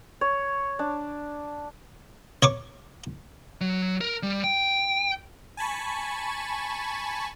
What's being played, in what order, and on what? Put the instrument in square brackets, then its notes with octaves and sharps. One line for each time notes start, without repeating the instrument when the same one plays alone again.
[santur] C#5
D4
[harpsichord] C#5 C#6 D6
[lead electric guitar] F#3
A#4
G3
G5
[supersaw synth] G#5 A5 B5 C#6